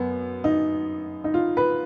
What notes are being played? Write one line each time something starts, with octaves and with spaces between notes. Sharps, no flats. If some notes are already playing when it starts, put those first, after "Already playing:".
Already playing: F#2 B3
D#4
D#4
F4
B4